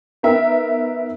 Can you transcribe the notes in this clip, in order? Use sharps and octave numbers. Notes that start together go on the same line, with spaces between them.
B3 D#4 A#4 E5